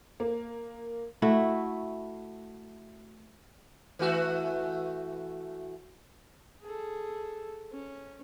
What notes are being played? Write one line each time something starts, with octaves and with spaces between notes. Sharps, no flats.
A#3
A3 E4 F#4
E3 A3 F#4
G#4 A4
C#4